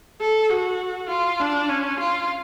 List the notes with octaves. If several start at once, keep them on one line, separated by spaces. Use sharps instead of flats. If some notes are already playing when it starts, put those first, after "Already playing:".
A4
F#4
F4
D4
C#4
F4